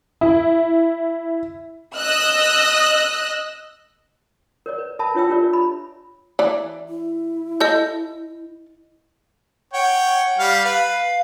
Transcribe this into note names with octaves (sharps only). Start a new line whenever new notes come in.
E4
D#5 E6 F#6
A#4 C#5 D5
B4
A#4 E5 A5 B5
D4 F4 C#5 E5 G5 E6
D4 F4 G4 A#4 C#5 D5
B5
E3 D5
E4
A4 D#5 A5 G6
C#5 F#5 G5
G3 F5
B4 F5